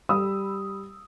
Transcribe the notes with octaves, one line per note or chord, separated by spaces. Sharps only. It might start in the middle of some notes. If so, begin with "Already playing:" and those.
G3 B5 D#6 E6